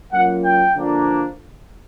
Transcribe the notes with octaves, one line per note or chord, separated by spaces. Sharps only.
F#3 A#3 C#4 F4 F#5
G5
D3 F3 A#3 D4